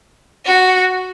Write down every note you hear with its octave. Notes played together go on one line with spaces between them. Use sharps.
F#4